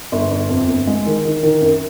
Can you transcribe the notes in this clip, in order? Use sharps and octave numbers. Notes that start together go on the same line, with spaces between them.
G1
G1
F2
G1
G#3
D#3
D#3
D#3
F#2